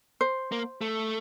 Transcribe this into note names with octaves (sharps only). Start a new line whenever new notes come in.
C5
A#3
A3